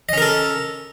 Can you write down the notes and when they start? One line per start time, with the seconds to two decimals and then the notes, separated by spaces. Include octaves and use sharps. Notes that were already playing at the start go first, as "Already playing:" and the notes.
0.09 D#5
0.13 C#4
0.18 A#4
0.22 A4